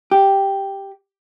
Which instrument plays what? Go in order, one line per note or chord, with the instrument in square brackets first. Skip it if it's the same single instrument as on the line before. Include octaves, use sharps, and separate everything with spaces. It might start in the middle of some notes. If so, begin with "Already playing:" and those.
[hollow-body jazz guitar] G4